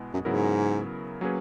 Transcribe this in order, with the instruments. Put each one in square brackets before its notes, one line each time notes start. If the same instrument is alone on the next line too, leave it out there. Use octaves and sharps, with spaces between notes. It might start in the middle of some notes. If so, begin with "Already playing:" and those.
Already playing: [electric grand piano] B2 G#3 B3 E4
[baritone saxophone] F#2
[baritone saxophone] G#2 [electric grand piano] C#3 F#3 B3 E4 A#4
[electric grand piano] F#3 A#3 C#4 G#4 B4